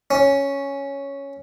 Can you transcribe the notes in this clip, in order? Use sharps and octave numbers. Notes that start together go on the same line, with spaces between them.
C#4